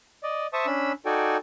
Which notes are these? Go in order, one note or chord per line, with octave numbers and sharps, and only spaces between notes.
D5 D#5
C5 E5 A5 C#6 D#6
C#4 D4 B5 E6
D#4 F#4 A4 D5 G5 G#5